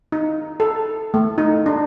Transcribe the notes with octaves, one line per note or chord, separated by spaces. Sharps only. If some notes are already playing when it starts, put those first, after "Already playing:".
D#4
A4
A3
D#4
D4